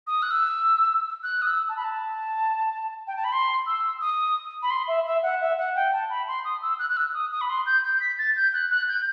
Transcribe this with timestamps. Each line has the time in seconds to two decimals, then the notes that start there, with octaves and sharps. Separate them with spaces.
0.07 D#6
0.22 F#6
0.31 E6
1.23 F#6
1.42 D#6
1.46 E6
1.69 A5
1.77 B5
1.84 A5
3.07 G5
3.16 A5
3.24 B5
3.32 C6
3.66 E6
4.01 D#6
4.62 B5
4.70 C6
4.88 E5
5.06 E5
5.23 F#5
5.41 E5
5.58 F#5
5.76 G5
5.93 A5
6.10 B5
6.28 C6
6.45 D#6
6.62 E6
6.79 F#6
6.90 F#6
6.97 E6
7.14 D#6
7.32 D#6
7.41 B5
7.49 C6
7.66 G6
7.84 G6
8.00 B6
8.18 A6
8.36 G6
8.53 F#6
8.70 F#6
8.88 G6